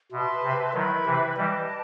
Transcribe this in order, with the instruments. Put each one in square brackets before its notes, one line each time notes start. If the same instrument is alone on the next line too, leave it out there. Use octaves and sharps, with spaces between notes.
[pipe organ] B2 [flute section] B4 E5 A5 C6
[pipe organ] C3
[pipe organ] D#3 F#3 [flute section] E4 B4 E5 B5
[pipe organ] C3 E3
[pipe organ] E3 G3 [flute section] G4 B4 D#5 A5